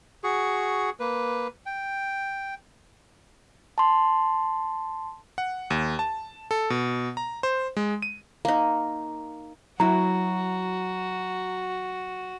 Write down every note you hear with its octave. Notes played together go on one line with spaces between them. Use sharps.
F#4 G#4 C#6
A#3 B4
G5
A5 C6
F#5
D#2
A5
A4
B2
A#5
C5
G#3
D#7
A#3 D#4
F#3 E4 F#4 A#5